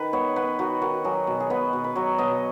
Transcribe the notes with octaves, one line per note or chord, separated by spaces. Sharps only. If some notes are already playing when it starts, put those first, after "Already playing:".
Already playing: D#3 B4
B3 C#5
B3 B4
D#3 F#4
D#3 F#4
F#3 G#4
B2
G#4
B3 B4
B2
B4
F#3 C#5
B2 D#5